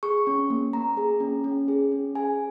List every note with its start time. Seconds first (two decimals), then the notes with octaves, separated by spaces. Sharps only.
0.03 G#4 C#6
0.27 C#4
0.50 A#3
0.73 A#3 A#5
0.97 G#4
1.20 C#4
1.44 C#4
1.68 G#4
1.92 C#4
2.15 G#4 G#5